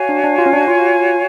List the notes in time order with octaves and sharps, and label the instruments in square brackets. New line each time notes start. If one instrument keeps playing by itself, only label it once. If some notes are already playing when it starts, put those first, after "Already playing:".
Already playing: [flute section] F#4 C#5 F5 G#5
[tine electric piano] D4
D4
F4
C#4
D4
F4